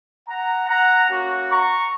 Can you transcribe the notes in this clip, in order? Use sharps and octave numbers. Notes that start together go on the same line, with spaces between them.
F#5 A#5
F#5 A#5
A#3 C#4 F#4
A#5 C#6